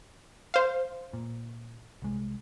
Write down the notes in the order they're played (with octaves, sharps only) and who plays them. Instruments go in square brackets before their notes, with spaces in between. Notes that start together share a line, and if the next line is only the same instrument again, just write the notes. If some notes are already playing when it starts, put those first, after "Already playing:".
[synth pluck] C5 F5
[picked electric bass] A#2
C2 G#3